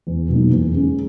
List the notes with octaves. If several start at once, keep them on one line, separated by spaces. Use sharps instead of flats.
E2
B2 F#3 A#3 D#4
E2
C#3 G#3 C#4